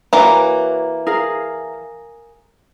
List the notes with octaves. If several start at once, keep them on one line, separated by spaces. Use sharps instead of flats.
E3 A#3 F#4 C#5 A#5
G#4 A#4 F5